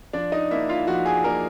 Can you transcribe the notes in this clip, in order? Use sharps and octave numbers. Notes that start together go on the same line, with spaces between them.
F3 D4 D5
D#4 D#5
A#3 D4 E4 E5
F4 F5
F3 F#4 F#5
G#4 G#5
A#3 D4 A#4 A#5